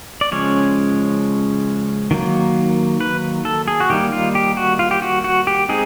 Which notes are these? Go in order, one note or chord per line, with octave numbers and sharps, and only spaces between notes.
D5
C#3 F3 G#3 C#4 C#5
D#3 F#3 A#3
B4
A4
G#4
F#4
D#3 G3 A#3 D#4 G4
F4
G4
F#4
F4
G4
F#4
F#4
G4
G#3 C4 D#4 G#4